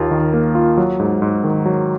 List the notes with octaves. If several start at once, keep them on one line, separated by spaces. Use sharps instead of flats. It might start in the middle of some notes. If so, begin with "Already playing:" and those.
Already playing: D#2 A#3 F4
D#3
A#3
F4
F#3
G#2
G#2
D#3
F#3